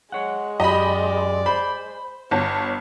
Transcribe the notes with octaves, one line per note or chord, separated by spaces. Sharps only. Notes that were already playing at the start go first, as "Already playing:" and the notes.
G#3 C#5 F#5
F#2 G4 D5 D#5 B5
C5 B5
G1 C#5 A5